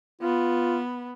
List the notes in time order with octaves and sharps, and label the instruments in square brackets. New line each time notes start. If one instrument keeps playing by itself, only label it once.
[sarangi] B3 [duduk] F4